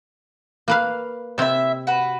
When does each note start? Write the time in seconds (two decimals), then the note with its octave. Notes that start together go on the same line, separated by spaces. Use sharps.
0.68 A#3 B4 F5
1.38 C3 C4 E4 E5
1.87 F#4 B4